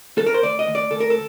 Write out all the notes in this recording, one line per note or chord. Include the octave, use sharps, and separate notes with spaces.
A4
A#4
C5
D2 D5
D#5
D2
D5
D2 A4
A#4
A4